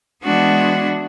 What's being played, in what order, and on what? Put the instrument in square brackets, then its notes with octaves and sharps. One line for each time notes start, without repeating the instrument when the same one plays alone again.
[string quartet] E3 G#3 B3 D4 F#4